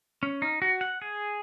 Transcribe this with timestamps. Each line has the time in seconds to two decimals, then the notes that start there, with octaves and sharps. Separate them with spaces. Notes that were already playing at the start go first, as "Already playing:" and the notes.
0.23 C#4
0.42 D#4
0.62 F#4
0.81 F#5
1.02 G#4